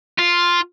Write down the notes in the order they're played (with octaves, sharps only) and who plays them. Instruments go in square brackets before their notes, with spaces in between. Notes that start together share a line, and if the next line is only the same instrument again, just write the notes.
[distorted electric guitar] F4